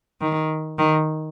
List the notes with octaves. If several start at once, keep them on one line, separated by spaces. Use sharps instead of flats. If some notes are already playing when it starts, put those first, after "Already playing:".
D#3
D#3